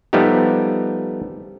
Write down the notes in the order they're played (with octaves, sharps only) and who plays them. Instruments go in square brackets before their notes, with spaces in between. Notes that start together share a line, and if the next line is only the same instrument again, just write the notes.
[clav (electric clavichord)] F3 G3 A3 B3 D#4 G4